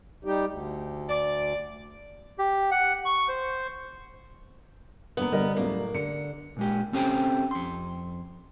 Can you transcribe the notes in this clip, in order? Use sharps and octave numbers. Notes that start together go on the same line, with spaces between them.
G3 D#4 G4
D2
D5
G4
F#5
C#6
C5
D2 A#3 B3 A#4
G1 G3 A#4 D#5
F#2 A2 A#3
D3 C#7
A#2 G#3 G4
C4 C#4 G4 A4 C5 G5
F2 C6